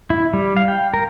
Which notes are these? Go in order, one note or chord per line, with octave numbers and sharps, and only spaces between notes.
E4
G3
F5
G5
A#4